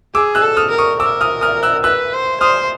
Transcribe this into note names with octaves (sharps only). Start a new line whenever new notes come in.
G#4 D6 E6
E6 F#6
A4
D#6 F6
A#4
C#6 D#6
A#4 D6 E6
D#6 F6
D#6 F6
E6 F#6
B4 E6 F#6
C5
C5 D#6 F6